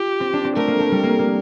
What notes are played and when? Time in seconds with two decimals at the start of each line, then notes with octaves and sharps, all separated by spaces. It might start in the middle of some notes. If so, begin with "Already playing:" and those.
Already playing: F4 G4
0.20 C4
0.33 D4
0.44 C4
0.56 A3 A#4
0.68 A#3
0.80 A3
0.92 G3
1.03 A#3
1.19 A#3